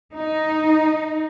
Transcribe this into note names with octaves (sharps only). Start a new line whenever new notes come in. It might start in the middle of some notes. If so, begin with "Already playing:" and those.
D#4